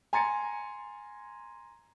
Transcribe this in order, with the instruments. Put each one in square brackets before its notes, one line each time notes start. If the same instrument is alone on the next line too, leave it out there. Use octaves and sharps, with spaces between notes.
[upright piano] G#5 A#5 C6 G#6 A6 C#7